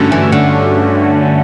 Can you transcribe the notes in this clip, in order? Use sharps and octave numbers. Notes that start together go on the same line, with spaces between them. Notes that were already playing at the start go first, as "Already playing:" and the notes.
Already playing: G2 D3 A3 C#4 F#4
E3
D3